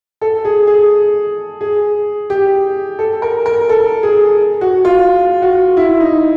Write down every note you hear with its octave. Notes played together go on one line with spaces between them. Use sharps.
A4
G#4
G#4
G#4
G4
A4
A#4
A#4
A4
G#4
F#4
F4
F#4
E4
D#4